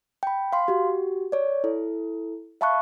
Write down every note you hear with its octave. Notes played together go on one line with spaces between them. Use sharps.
G5 B5
F5 C6
F#4 G4
C#5 D5
E4 A4
E5 F5 A5 B5 C#6 F#6